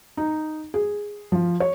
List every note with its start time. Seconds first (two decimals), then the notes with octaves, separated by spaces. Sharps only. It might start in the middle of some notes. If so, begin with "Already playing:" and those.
0.17 D#4
0.74 G#4
1.32 F3
1.60 C#5